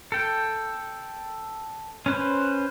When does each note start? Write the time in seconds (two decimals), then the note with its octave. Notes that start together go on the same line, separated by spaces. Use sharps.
0.12 A4 G5
2.06 C#4 B4 C5